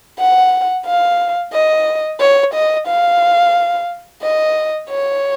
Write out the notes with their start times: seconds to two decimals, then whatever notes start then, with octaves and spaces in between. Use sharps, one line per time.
0.19 F#5
0.86 F5
1.53 D#5
2.20 C#5
2.54 D#5
2.87 F5
4.22 D#5
4.89 C#5